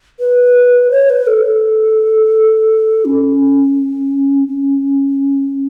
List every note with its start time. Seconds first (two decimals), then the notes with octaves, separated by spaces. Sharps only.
0.20 B4
0.91 C#5
1.10 B4
1.27 A4
1.45 A4
3.05 C#4
4.48 C#4